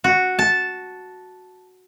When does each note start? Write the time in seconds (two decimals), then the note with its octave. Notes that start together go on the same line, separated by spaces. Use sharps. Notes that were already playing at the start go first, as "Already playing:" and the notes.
0.04 F#4
0.39 A5